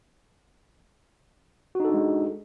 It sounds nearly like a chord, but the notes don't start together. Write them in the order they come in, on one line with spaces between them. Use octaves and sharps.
F#4 D#4 A4 D4 G#3